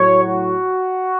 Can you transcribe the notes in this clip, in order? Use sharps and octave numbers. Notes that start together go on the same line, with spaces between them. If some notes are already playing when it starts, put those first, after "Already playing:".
Already playing: A2 F#3 C#5
F#4